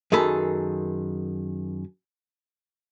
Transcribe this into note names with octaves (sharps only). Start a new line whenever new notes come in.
F#2 D#3 G#4 A4 B5